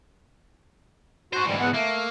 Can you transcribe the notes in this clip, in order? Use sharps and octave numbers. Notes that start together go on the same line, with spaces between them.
D#4 F#4 C5
D2 G#2 E3 G3
E2 B3 F#5
A3 A#3